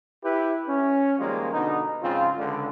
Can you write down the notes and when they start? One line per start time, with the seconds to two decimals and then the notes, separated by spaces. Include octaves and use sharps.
0.24 E4 G4 B4
0.68 C#4
1.19 D#3 F3 G3 G#3 A#3 F4
1.53 B2 D3 B3 D#4
2.02 G#2 C#3 F3 C4 F4
2.37 C#2 D3